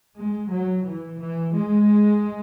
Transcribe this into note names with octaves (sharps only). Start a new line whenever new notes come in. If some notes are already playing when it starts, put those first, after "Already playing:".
G#3
F#3
E3
E3
G#3